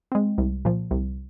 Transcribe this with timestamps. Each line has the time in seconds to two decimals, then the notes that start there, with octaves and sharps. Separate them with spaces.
0.12 G#3 C4
0.38 C2
0.65 A#2 F3
0.91 C2